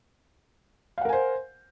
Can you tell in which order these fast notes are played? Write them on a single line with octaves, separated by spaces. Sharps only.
F5 F#5 A#4 G#5 C5